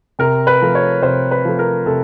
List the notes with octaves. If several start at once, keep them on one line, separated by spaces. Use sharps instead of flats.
C3 A#4
B4
F3 A3
C#5
C3 C5
B4
F3 A3
A#4
C3 A4